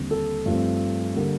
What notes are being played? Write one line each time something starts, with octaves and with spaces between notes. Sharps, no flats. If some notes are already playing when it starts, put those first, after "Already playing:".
Already playing: D#2 D3 G3 C4
A4
G2 F3 A3 C4
D3 G3 A#3